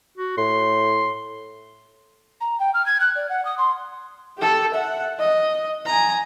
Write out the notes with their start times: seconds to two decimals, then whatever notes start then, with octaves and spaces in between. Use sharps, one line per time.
0.18 F#4
0.38 A2 C6
2.40 A#5
2.59 G5
2.73 F6
2.85 G#6
3.00 F#6
3.15 D5
3.29 F#5
3.45 D#6
3.57 C6
4.38 G4 A4
4.74 E5 F#5
5.19 D#5
5.86 G#5 A#5